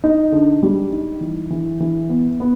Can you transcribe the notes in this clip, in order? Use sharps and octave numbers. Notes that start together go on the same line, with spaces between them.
D#4
D3
G3
D#4
E3
E3
E3
B3
B3